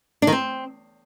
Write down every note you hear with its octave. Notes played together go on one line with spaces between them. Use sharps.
D4
D#3
C4